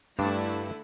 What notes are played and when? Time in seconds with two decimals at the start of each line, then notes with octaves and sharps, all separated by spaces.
0.19 G2 D3 A3 D4 E4 A5